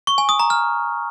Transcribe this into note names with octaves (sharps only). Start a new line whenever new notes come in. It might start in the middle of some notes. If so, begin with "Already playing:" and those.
C#6
G#5
D#6
A#5
F6